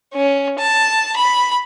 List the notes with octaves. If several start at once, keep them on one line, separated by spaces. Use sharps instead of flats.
C#4
A5
B5